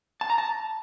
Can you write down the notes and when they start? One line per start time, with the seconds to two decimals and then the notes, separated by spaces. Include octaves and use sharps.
0.21 A5
0.30 A#5
0.38 A5